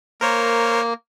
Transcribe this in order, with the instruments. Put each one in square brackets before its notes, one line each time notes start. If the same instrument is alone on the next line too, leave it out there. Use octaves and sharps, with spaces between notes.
[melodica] A#3 [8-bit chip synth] A#4 C5 C#5